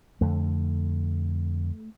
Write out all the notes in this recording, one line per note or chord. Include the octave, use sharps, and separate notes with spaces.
F2 D3 A3